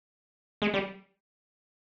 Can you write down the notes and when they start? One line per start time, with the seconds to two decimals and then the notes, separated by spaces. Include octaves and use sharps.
0.62 G#3
0.74 G3